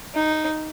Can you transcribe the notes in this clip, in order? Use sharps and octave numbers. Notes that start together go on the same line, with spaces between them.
D#4